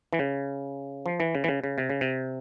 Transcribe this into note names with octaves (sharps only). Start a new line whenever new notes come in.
E3
C#3
F3
E3
C#3
E3
C#3
C#3
C3
C#3
C3